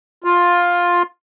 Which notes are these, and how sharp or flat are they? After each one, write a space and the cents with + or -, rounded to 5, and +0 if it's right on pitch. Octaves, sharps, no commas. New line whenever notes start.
F4 +10